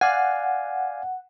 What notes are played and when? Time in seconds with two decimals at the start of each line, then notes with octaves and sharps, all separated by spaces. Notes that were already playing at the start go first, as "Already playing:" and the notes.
0.01 D5 F5 F#5 G#5